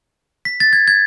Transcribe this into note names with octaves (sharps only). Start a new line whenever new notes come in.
B6
A6
G#6
G#6